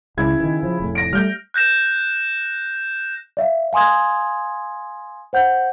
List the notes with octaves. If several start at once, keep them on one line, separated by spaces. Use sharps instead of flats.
C#2 C#3 E4 G#6
D#3 E3
F3
F1 A2
A#6 D7
G3 A3 F6 G6
F#6 G6 A#6 E7
D5 E5 F5
F5 G#5 C6 D#6 G#6
C5 F#5 G6